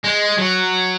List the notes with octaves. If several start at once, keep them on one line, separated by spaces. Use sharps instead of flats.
G#3
F#3